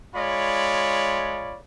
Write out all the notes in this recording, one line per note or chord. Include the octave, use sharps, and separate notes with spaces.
G#3 F4 C#5 D5 B5